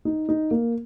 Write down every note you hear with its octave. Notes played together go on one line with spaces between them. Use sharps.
D#4
D#4
A#3